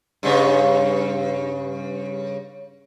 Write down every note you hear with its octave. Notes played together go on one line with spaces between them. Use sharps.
G2 C#3